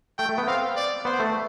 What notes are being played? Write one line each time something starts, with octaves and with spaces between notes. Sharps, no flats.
A3 G5
A3
B3
C4 F5
D5
B3 C5
A3